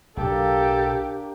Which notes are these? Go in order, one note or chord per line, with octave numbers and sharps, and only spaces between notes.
B1 A2 F#3 A#3 D4 G4 A4